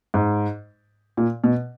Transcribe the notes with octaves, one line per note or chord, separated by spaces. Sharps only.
G#2
A#2
B2